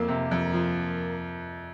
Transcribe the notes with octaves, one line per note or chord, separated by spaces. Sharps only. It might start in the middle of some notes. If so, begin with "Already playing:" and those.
Already playing: F2 A#3
C3
F2
F3